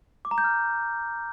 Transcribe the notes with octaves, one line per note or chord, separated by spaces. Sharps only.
D6
A#5
G6
F6